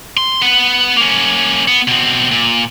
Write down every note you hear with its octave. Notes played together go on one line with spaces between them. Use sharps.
C6
B4 F#5
A#3 C#4
B3
B2 C4
A#2